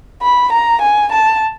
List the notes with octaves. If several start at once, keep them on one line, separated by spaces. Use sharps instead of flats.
B5
A#5
G#5
A5